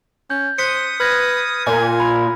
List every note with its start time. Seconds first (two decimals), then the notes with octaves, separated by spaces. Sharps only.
0.30 C#4 G6
0.58 C5 D#6 F#6 B6 C#7
1.00 B4 F6 G#6 A#6
1.67 A#2 G#5
2.00 B5